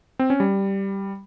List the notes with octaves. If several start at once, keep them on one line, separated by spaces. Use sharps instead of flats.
C4
C#4
G3